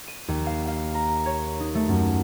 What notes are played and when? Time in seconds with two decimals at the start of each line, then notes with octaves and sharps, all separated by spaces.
0.08 D#7
0.28 D#2
0.46 F5
0.68 F5
0.94 A#5
1.26 C#5
1.60 D#4
1.75 A3
1.88 F#2